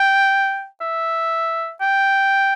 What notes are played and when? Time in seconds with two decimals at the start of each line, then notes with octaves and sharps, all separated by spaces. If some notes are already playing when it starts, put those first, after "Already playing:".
Already playing: G5
0.81 E5
1.81 G5